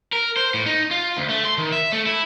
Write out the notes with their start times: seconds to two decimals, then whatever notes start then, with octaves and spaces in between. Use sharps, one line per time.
0.13 A#4
0.36 C5
0.54 A2
0.66 D#4
0.91 F4
1.17 D2
1.30 A3
1.45 C6
1.58 D#3
1.72 E5
1.92 A3
2.06 E4